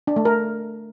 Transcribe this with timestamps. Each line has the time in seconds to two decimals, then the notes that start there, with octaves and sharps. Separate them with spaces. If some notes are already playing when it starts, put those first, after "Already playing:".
0.07 D4
0.16 A3
0.25 A#4